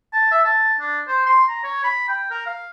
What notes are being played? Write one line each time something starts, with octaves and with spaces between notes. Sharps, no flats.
A5
E5
A5
D4
C5
C6
A#5
C#5
B5
G5
A#4
F5